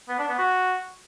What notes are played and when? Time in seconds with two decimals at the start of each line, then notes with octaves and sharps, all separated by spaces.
0.09 B3
0.19 D4
0.29 B3
0.39 F#4